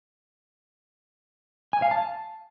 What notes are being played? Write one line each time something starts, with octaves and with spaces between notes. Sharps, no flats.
G#5
F5
A5